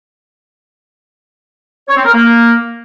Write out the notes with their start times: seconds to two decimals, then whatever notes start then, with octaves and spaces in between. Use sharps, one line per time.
1.88 C#5
1.96 C4
2.05 A#4
2.14 A#3